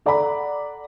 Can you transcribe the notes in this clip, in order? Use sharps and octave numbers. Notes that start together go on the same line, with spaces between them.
A4 D5 F#5 A#5 B5